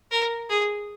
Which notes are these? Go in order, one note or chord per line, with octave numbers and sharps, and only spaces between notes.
A#4
G#4